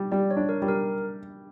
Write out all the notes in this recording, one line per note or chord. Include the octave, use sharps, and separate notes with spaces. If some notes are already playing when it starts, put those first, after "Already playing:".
Already playing: G3
G3 D5
C#5
D4
A#4
G3
A#4